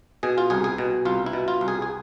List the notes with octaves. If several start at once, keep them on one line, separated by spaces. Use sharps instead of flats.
B2 G#4
F4
C2 G#4
G#4
B2
C2 F4
E4
B2
F4
C2
G#4
G#4